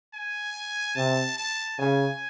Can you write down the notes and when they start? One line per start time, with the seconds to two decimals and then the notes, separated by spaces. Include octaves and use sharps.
0.13 G#5
0.95 C3 A5
1.37 A5
1.78 C#3 G#5